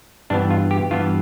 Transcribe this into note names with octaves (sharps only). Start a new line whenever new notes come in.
G2 E3 B3 D4
F4
G4
G2 E3 B3 F4